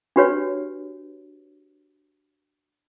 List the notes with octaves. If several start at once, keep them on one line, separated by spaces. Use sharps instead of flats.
D4 F#4 G4 B4 C#5